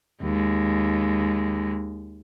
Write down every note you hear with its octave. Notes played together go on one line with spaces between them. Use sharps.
D#2 G#3